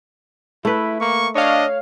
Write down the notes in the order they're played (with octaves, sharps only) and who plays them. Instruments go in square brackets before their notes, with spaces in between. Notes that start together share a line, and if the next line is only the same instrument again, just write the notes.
[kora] A3 B4 [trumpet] E4
[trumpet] A#3 [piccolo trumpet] C#6
[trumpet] D4 [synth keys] C#5 F5 [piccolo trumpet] D#5